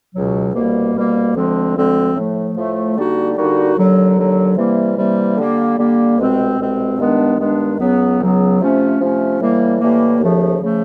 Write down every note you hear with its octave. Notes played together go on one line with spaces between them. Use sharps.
C#2 B2 F#3
C2 B2 G3 A#3
C2 B2 G3 A#3
D2 D3 F3 G#3 C4
D2 D3 F3 G#3 C4
A2 F3 A3
A2 F3 A3
D3 G3 A#3 D#4 F#4
D3 G3 A#3 D#4 F#4
D#2 D3 F#3
D#2 D3 F#3
C3 E3 G3 A#3
C3 E3 G3 A#3
D3 G3 A#3
D3 G3 A#3
C2 B2 G#3 C4
C2 B2 G#3 C4
G2 D#3 G#3 B3 D4
G2 D#3 G#3 B3 D4
C#2 C#3 F#3 B3
C#2 C#3 F#3 B3
C3 F3 A3 C#4
C3 F3 A3 C#4
A2 E3 G3 A#3
A2 E3 G3 A#3
D#2 C#3 F3 A3
C#3 F3 A3